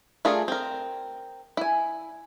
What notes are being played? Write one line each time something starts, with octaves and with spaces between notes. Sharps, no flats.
A3 D4 F4 G#4 A#4
C4 A#4
E4 G#5